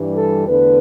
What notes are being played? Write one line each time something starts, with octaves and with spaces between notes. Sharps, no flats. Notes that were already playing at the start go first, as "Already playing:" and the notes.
Already playing: G2 E3 G3
A4
E2 D3 A3 B4